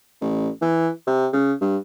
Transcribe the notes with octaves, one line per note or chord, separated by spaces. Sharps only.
A1
E3
C3
C#3
G2